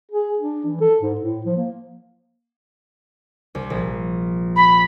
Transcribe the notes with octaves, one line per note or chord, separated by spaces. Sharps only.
G#4
D4
E3
A4
G#2
A2
F3
A#3
C2
A#1
B5